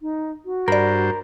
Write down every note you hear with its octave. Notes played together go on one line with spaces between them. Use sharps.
D#4
F#4
G2 A#4 C5 D5 B5